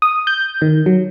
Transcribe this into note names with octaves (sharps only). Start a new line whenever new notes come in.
D#6
G6
D#3
F#3